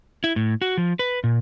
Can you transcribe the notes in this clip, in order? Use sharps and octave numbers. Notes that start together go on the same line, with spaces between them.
E4
A2
F#4
F3
B4
A#2